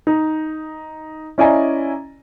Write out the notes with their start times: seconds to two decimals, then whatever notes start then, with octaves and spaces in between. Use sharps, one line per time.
0.07 D#4
1.38 C#4 E4 D5 D#5 G#5 A#5